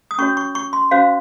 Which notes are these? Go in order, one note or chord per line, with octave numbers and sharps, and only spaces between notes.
D#6
C#4 F#4 C#5 C#6
C#6
C#6
C6
C#4 F#4 C5 F5